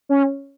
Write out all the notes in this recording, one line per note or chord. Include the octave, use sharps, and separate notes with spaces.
C#4